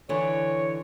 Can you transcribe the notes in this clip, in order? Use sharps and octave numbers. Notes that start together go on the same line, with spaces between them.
D3 E3 C#5